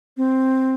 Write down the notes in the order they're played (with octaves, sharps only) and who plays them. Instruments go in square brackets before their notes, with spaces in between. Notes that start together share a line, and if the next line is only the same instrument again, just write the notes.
[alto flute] C4